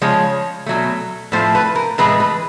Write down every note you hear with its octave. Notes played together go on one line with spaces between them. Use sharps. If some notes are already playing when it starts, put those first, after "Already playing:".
C#3 F3 G#3 C#5
B2 F#3 A3
A2 F3 A3 C5
B4
A#4
A2 E3 G#3 B4
B4